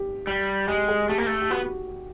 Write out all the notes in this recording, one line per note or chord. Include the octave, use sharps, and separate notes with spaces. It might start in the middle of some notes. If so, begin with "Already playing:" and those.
Already playing: G4
G3
G#3 G4
G#4
A3 G4
A#3
A3
G4
B3 F#4